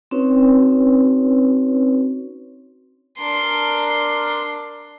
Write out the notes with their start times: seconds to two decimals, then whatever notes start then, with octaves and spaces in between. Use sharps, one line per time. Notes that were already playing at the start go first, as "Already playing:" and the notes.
0.11 C4 C#4 D#4 F#4 B4 C#5
3.19 D4 A#4 C6